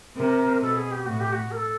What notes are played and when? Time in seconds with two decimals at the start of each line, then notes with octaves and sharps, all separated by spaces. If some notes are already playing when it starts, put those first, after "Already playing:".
0.16 C3 A#4
0.61 B2 A4
0.76 G#4
0.91 G4
1.05 A2 F#4
1.20 G4
1.32 F#4
1.51 A#4
1.56 A4